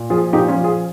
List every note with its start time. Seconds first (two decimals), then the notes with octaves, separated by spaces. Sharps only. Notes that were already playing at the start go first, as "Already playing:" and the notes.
Already playing: A#2
0.10 F3 F4 G#4
0.33 A#2 D#4 G4
0.49 C#4 F4
0.55 F3
0.64 F4 G#4